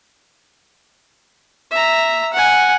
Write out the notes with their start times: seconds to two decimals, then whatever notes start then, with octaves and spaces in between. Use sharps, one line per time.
1.71 E5 A#5
2.33 F#5 G#5